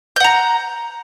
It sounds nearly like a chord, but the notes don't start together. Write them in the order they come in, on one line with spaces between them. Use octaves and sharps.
G6 F#5 A#5